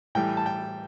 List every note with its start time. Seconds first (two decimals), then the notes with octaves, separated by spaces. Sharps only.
0.15 A2 E3 G3 G5
0.37 A5
0.46 G5